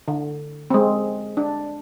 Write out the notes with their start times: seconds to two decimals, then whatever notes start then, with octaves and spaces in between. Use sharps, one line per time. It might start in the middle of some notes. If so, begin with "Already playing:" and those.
0.08 D3
0.70 G#3 C4
1.37 D4